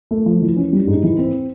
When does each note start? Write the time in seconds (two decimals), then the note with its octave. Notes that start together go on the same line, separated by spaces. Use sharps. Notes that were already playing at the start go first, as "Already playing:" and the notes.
0.11 A3
0.26 F3
0.42 E3
0.56 C#4
0.73 G3
0.87 G#2
1.03 E3
1.18 C4